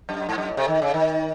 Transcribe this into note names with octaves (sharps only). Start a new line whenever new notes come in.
F#2
G#2
F#2
A2
C3
D#3
C#3
D#3